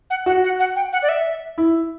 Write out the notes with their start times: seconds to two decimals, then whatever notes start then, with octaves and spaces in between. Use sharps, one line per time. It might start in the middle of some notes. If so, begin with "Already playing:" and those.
0.10 F#5
0.26 F#4 F#5
0.44 F#5
0.60 F#5
0.76 G5
0.93 F#5
1.03 D5
1.09 E5
1.58 E4